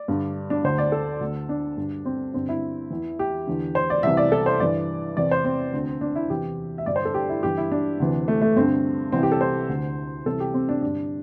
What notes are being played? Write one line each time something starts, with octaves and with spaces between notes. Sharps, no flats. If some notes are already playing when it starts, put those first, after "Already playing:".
Already playing: D5
G2 D3
D4
D2 D3 C5
D5
A4
D2 D3
D4
G2 D3
C4
G2 D3 C4
E4
E2 E3
G4
E2 D3
C5
D5
C2 C3 E3 E5
D5
A4
C5
G2 E3 D5
E2 C3 E3 D5
C5
C4
D2 D3
D4
E4
E2 C3 E3 G4
E5
G2 D3 D5
C5
A4
G4
E4
G2 E3 G4
E4
D4
D2 C3 E3
A3
A3
G2 D3 C4
C2 C3 E3 C4
G4
A4
C5
D2 D3
C2 C3 E3 A4
G4
C4
D4
G2 D3 D4